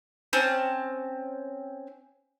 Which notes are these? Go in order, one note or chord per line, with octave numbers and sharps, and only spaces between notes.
C4 C#4 A5